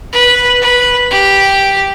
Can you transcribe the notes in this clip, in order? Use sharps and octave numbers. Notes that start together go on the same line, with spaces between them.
B4
B4
G4